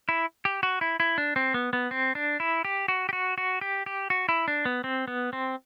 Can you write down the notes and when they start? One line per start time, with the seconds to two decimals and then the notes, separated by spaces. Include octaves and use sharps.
0.09 E4
0.45 G4
0.63 F#4
0.81 E4
1.00 E4
1.18 D4
1.36 C4
1.54 B3
1.73 B3
1.91 C4
2.15 D4
2.40 E4
2.65 G4
2.88 F#4
3.09 G4
3.13 F#4
3.38 F#4
3.61 G4
3.86 G4
4.10 F#4
4.29 E4
4.48 D4
4.65 B3
4.84 C4
5.08 B3
5.33 C4